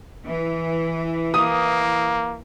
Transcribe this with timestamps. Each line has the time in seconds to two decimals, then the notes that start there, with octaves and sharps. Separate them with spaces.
0.24 E3
1.34 A#3 D#6